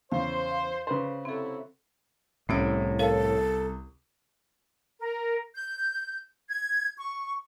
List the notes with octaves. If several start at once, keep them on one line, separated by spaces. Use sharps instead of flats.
E2 C#3 C5 F5
F5
C#3 B4 C5
C3 F#3 C4 E4 A4
C2 A2 C#4 D7
A4 A#4 C#5 F5
A#4
G6
G#6
C#6